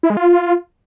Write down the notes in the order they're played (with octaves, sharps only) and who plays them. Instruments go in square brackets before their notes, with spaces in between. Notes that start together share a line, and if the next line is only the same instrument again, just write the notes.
[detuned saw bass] E4
G#3
F4